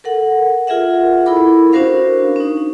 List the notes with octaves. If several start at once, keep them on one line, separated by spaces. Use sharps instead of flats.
A4 A#4 F#5
F4 G#4 A#4 E5 F#5
E4 A4 A#4 B5 D6
C#4 D4 F#4 A#4 C5 F5
C#4 D#4